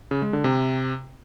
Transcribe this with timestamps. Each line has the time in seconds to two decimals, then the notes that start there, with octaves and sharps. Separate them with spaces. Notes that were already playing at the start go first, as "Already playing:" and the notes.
0.11 C#3
0.22 G#3
0.33 D3
0.44 C3